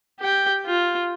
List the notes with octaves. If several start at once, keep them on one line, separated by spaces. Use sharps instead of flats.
G4 G5
F4